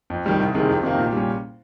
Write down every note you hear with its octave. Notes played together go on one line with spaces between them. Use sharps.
F2
D#3 G3
C2
C3 D#3 G#3
F2
C3 D#3 A#3
A#2
G3 C#4